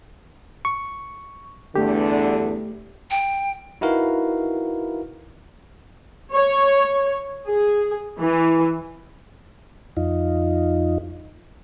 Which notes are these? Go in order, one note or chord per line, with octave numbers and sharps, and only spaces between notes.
C#6
E2 G2 D3 A3 G4
G5
D#4 E4 F#4 A#4 B4 F5
C#5
G#4
E3
F2 D#4 F4